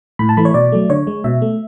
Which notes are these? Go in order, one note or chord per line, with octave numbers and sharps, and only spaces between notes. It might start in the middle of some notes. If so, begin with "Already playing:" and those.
A2 B5
A5
E3 A3 B5
C#5
B2 D5
F#3 A3
D3 C#5
G#3
B2 E5
A3